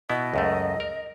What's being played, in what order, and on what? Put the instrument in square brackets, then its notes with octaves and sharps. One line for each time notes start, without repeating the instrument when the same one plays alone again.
[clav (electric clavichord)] B2 B3 E4 [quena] D#5
[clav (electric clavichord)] C#2 F#2 A3
A#4